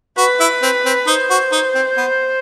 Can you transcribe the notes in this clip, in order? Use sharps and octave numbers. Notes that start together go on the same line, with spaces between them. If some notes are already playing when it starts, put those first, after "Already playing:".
F#4 B4
E4
C4
C4
D#4 C5
F#4
D#4
C4
B3